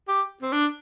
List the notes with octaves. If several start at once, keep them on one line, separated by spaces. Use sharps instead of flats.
G4
C4
D4